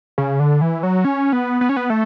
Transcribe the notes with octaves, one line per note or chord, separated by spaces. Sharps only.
C#3
D3
E3
F#3
C#4
B3
B3
C#4
B3
A3